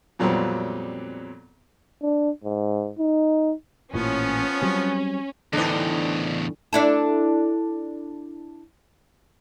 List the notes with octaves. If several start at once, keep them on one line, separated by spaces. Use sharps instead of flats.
F2 A#2 F#3 G3 B3 C4
D4
G#2
D#4
A1 A#2 E3 F3 B3 C#4
F#3 G3 C4
E2 A2 D3 E3 D4 D#4 C5
D4 E4 A4